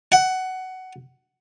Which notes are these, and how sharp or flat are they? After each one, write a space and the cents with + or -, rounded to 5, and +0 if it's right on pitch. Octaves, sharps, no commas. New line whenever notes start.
F#5 +15